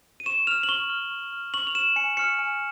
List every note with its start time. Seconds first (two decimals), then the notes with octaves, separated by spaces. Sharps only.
0.20 D#7
0.26 C#6 E7
0.47 F6 F7
0.63 F#7
0.69 C#6 G7
0.90 F6
1.11 C#6
1.33 F6
1.54 C#6 F#7
1.67 F7
1.75 F6 E7
1.96 G#5 C#7
2.17 C#6 F6 C#7
2.39 G#5